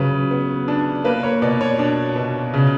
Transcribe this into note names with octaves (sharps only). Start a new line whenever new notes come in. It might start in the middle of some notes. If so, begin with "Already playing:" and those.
Already playing: C#3 F#3 B4
B3
D4
A#3 B4
C#5
B2 D5
C#5
D4
B2
C#3